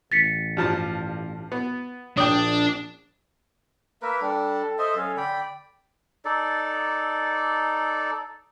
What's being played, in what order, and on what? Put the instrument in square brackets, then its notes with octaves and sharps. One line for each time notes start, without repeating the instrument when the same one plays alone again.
[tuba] A1 [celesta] A6 B6 C#7
[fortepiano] G2 F3 A5
B3
[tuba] A#1 [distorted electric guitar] D4 [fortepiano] D5 G5 [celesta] D#6
[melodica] A#3 A#4 B4 [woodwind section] E5
[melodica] G3 D4 [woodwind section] A4
[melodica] C5 D#5 E5
[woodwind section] F#3 C#4 A4 [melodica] F5
[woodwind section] D3 [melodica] D5 G5 B5
[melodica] D#4 A4 D5